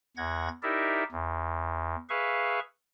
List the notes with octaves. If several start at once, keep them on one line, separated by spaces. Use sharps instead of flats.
E2 F#5 G#6 A#6
D#4 E4 G4 A#4 D5 E5
E2
G#4 B4 E5 F5 C#6